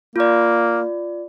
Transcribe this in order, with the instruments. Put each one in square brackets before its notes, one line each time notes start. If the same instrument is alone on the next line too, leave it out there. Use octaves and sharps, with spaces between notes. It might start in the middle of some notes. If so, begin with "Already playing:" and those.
[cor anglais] A#3 [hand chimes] F4 D5